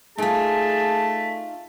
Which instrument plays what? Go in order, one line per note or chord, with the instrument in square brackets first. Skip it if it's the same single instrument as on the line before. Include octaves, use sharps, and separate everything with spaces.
[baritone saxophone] A3 [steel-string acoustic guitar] D#4 F4 [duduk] G#4 [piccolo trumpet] A5